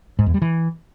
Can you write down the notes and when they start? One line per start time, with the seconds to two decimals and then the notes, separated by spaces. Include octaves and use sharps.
0.19 G#2
0.26 E2
0.34 G3
0.42 E3